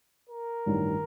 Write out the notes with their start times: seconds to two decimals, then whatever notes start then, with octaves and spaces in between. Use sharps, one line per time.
0.30 A#4
0.66 A1 G2 D#3